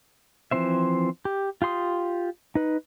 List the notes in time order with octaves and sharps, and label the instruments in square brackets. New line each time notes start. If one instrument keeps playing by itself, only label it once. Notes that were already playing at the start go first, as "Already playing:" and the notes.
[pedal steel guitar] E3 F3 C4 C5 E5
G4
F4 G4 C6 D#6
D#4 B4